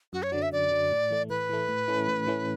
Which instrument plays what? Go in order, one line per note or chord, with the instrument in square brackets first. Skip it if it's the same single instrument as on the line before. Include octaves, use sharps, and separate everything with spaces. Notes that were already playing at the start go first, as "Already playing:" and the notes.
[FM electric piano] F#2 [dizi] F#4
[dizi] C#5
[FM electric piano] D3 F#3 [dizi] D5
[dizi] E5
[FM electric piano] F#2 [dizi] D5
[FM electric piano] D3 F#3
A2
E3 A3
[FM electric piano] A2 [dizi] B4
[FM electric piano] E3 A3
A2
E3 A3 C#4
A2
E3 A3 C#4